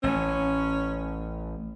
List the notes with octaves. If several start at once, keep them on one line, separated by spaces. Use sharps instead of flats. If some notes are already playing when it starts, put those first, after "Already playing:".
A1 C#4